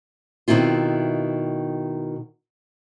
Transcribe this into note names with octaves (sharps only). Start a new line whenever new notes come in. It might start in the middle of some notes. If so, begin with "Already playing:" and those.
B2 D#3 C4 E4 F4